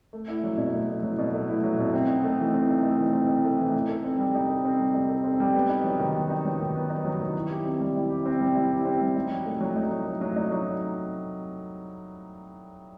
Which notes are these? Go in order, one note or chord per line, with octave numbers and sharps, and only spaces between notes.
A3
E4
F#3
B2
A3
E4
F#3
B2
A3
E4
F#3
B2
C4
D#4
A3
E3
C4
D#4
A3
E3
C4
D#4
A3
E3
D#4
A4
C4
G3
D#4
A4
C4
G3
D#4
A4
C4
G3
B3
D#4
F#3
D#3
B3
D#4
F#3
D#3
B3
D#4
F#3
D#3
E4
G4
C4
G3
E4
G4
C4
G3
E4
G4
C4
G3
D#4
F#3
A3
F#3
D#4
F#3
A3
F#3
D#4
F#3